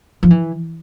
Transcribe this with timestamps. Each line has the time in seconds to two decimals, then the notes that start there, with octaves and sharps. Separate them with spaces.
0.23 F3
0.31 E3